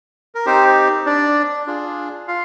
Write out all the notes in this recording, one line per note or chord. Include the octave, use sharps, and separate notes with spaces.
A#4
C4 D#4 G4 C5
D4 D5
D4 F4 G#4
F4 F5